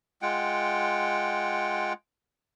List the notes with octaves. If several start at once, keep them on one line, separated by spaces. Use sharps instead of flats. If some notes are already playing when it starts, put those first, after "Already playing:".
G#3 F4 F#5 G5